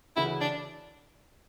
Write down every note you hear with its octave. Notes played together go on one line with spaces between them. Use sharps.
D2 C#3 E3 E4
D4